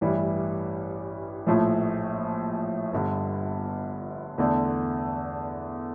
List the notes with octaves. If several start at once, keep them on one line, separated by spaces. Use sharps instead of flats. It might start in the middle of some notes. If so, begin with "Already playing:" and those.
A1 G2 E3 G3
A#1 A2 F3 A3
G1 G2 D3
E2 D3 A3 D4